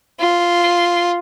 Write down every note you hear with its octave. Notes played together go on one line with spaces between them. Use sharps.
F4